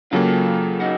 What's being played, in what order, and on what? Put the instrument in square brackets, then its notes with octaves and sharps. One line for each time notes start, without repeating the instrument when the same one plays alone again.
[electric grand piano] C#3 F#3 A#3 [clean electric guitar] F4 A4
[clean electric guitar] D#4 F#4